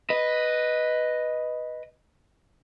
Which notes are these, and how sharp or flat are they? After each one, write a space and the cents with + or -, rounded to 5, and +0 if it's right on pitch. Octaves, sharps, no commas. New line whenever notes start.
B4 +0 D#5 +0